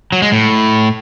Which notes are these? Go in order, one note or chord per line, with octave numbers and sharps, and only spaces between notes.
F#3
G#3
A2